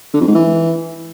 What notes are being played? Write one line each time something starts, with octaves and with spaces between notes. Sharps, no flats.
D3
F2
G#2
E3